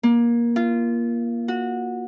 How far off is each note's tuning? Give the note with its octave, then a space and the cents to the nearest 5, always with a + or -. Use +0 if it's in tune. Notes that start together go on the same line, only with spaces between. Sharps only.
A#3 +20
F4 -20
F#4 -20